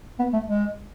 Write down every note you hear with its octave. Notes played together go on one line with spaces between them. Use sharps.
B3
A3
G#3